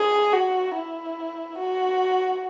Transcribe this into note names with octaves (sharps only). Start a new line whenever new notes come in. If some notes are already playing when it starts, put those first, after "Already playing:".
Already playing: G#4
F#4
E4
F#4